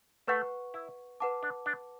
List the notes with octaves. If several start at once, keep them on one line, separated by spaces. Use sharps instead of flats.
A3 B4 F#5 C#6
E4
B4 F#5 A5 D6
D4
D4